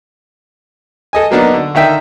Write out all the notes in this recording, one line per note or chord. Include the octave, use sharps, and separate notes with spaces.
A4 D#5 G#5
F#3 A#3 B3 D4 D#4
D3
D3 D#3 E5 G5